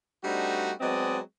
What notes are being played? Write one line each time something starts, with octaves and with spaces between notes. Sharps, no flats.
G3 A3 C4 D4 D#4 F#4
F#3 G#3 B3 C4 D5 D#5